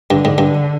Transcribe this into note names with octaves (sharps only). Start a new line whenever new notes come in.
G2 D3
G#2
G2